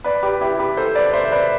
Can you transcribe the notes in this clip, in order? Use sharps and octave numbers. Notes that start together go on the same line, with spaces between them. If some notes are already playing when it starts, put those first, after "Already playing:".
B4 D5
G4 B4
E4 G4
G4 B4
A4 C5
B4 D5
C5 E5
B4 D5